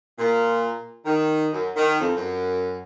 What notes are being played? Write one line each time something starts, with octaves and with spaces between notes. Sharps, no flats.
A#2
D#3
F#2
D#3
F2
F#2